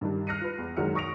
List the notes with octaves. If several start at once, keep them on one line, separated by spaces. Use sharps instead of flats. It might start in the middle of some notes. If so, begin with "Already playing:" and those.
G2 D#3 G3 D4
F6 F#6 A#6 C7 C#7 D#7
F4 B4
E2
F#2 D#3 G#3 F#4 F6 C#7
C#6 D#6 A#6 D7 F7